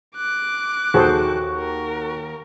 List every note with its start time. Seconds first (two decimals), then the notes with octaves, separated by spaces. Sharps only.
0.17 D6 F#6
0.94 D#2 F#4 G#4 A4 C5
1.57 A#4